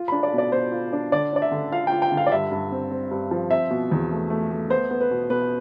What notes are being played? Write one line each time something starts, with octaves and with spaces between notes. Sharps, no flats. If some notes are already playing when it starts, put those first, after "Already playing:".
Already playing: F4
B5
D4
D5
B2 D5
B2 C5
F4
D4
D3 D5
D4 D5
E5
D3
F4 F5
G5
F4
G5
D3
F5
D5
G2 E5
G2
C4
C4
G2
F3
C4 E5
B2
E2
A3
A3
A3
B3 C5
B3
B4
B2
B2 B4